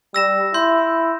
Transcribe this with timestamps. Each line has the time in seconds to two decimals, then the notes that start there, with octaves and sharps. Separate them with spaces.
0.14 G3 E6 A#6 E7
0.54 E4 C6 G6